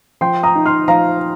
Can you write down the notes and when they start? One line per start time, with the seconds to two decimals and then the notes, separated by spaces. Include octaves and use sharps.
0.21 F3 G5 C6
0.43 A#5 D#6
0.55 D#4
0.66 C6 F6
0.88 F3 F5 A#5